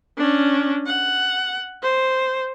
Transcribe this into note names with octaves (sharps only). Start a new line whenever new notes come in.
C#4 D4
F#5
C5